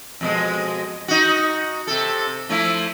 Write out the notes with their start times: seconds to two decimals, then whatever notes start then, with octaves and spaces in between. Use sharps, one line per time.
0.21 F2 B2 G#3
1.08 D#4 F#4
1.87 C3 A4
2.49 F3 A3 E4